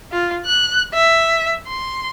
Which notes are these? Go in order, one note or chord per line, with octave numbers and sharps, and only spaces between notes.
F4
F#6
E5
C6